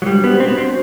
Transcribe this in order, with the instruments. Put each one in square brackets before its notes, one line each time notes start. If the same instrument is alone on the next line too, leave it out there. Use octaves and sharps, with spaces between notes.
[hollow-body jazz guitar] F#3
[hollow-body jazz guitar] G3 [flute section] D4 F#4 C5
[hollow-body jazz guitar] B3
C4
B3
C4